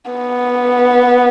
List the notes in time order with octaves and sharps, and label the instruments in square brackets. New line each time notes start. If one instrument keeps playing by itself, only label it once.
[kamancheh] B3